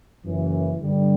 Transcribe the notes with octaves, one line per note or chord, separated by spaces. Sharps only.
F#1 F#2 E3
G2 D3 G3